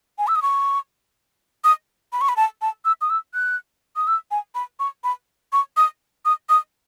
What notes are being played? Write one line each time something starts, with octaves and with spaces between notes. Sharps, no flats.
G#5
E6
D#6
C#6
D#6
B5
C#6
B5
A5
A5
E6
D#6
E6
F#6
D#6
E6
G#5
B5
C#6
B5
C#6
D#6
D#6
D#6